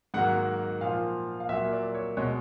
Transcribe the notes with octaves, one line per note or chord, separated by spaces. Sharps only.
G#2 D#3 F#3 A#3 F#5
A#2 F3 A#3 F5
F5
A#2 F#3 A#3 E5
D5
C#5
B2 G#3 C#5